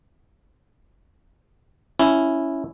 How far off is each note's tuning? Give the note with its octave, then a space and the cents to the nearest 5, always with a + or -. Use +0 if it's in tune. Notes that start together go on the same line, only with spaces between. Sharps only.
C#4 +5 E4 +0